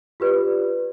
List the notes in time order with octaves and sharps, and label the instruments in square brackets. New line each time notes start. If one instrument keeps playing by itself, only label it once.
[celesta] F4 G4 B4 D5